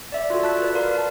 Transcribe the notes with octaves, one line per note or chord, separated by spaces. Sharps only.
D5 E5
F4 F#4 A4
A5 F#6 B6
B4 D5
A#4 F5 C6
A#4 A5